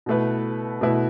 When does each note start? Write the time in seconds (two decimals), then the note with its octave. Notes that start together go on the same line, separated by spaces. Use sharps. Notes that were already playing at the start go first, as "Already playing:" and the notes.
0.06 B2 A3 E4 B4
0.81 B2 A3 E4 B4